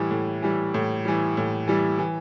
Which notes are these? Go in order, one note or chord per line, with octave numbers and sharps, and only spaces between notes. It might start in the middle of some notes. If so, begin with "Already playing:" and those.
Already playing: A2 E3 G3
A2
E3 G3
A2
E3 G3
A2
E3 G3
E3